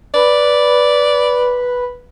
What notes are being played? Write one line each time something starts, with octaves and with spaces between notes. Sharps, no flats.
B4 D5